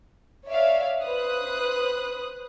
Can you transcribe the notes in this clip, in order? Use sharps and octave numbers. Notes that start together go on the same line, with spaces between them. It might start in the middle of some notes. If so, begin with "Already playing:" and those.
C#5 D5 E5 F5
B4 C5 D#6 F#6